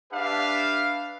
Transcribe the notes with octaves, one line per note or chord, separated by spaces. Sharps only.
D4 G4 B4 E5 F5